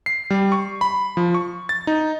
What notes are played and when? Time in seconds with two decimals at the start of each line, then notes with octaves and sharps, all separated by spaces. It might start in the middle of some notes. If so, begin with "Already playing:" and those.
0.06 C7
0.30 G3
0.52 C#6
0.81 B5
1.17 F3
1.34 C#6
1.69 A6
1.87 D#4